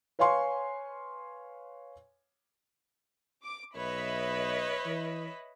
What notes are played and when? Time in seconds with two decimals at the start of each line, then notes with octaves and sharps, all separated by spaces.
0.19 B4 C#5 F5 G#5 C6 C#6
3.43 D6
3.76 B1 B4 C#5 D#5 E5 B5
4.86 E3